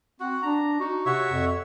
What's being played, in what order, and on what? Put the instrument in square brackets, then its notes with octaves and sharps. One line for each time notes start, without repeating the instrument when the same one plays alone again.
[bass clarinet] C4 [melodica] F#4
[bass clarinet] D4 [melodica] A#5
[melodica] D#4 [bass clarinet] F#4
[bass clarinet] C3 [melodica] F#4 C#5 E5
[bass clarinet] F2